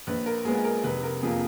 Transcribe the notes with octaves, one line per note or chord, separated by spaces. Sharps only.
A#1 B4
A#4
A#2 G#3 B3 G#4
G#4
A#4
F1 B4
A#4
F2 F3 A#3 G#4